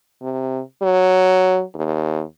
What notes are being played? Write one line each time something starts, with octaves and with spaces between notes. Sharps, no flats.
C3
F#3
D#2